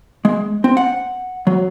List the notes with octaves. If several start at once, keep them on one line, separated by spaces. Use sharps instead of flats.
G#3
C4
F#5
F#3